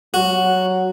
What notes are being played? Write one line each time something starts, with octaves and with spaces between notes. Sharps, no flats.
F#3 F#4